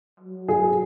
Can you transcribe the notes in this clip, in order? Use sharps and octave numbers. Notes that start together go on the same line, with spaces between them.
F#3
G#4